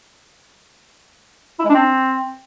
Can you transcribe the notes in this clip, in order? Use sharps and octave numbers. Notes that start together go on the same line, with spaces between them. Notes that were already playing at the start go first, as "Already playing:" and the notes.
E4
G#3
D4
C4